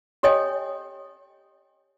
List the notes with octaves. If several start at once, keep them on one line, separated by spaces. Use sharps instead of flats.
G4 A4 C#5 D#5 G5 G#5